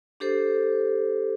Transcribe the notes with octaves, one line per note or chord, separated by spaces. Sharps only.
D4 G4 A4 C5